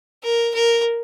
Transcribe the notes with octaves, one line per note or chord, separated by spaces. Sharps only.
A#4
A#4